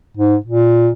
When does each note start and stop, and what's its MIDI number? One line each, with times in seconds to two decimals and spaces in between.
0.17 0.36 44
0.46 0.90 46